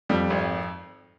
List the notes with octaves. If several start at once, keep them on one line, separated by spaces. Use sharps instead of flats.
F2 G3
G#1